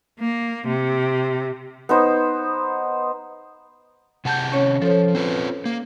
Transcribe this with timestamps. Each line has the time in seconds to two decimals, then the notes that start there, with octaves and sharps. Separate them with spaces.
0.19 A#3
0.67 C3
1.89 B3 D#4 C5
4.25 C3 G#4 F#5 A5 G6
4.52 C#4 C#5
4.82 F3 A4 C5 C#5
5.15 C4 F4 B4
5.65 A#3